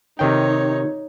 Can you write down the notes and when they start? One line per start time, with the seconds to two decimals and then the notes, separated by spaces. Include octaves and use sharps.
0.19 C3 D#3 D#4 C#5 G5